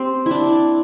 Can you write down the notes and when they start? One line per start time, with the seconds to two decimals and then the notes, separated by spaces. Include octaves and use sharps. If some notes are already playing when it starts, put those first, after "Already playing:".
Already playing: C4 G4
0.26 D4 E4